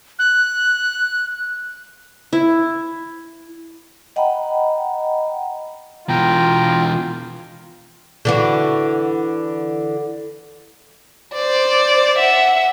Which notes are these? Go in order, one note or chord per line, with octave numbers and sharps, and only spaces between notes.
F#6
E4
D#5 F#5 G5 A#5 B5
B2 E3 F4 G5 A#5
D3 E3 F#4
C5 D5
E5 F#5